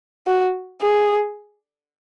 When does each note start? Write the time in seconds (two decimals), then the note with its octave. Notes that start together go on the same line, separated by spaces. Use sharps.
0.27 F#4
0.82 G#4